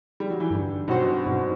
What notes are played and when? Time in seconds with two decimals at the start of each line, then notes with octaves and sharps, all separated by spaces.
0.20 G3
0.30 F#3
0.40 E3
0.50 G2 D3
0.88 B2 F#3 C4 F#4 C5
1.26 G2 B2